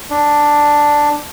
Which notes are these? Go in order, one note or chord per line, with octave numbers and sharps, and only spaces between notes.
D4